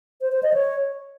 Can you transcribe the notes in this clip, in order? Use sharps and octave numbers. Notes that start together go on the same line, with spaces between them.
C5
C5
D#5
C#5